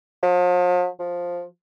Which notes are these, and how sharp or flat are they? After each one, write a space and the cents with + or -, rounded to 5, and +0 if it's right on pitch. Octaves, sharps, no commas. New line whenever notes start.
F3 +45
F3 +5